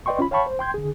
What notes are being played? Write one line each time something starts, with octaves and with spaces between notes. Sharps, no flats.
B4 D5 D#5 G5 C6 C#6
C#4 F4 B5
C#5 F5 G5 A5 B5 C#6
C5
G5 C6 G6 G#6
D3 G#4